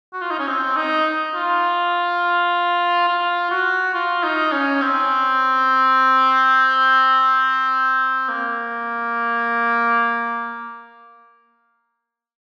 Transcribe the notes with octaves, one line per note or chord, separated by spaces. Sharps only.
F#4
F4
D#4
C#4
C4
D#4
F4
F4
F#4
F4
D#4
C#4
C4
A#3